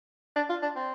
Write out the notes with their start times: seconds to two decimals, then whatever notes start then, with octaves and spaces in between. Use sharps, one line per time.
0.36 D4
0.50 F4
0.63 D4
0.76 C4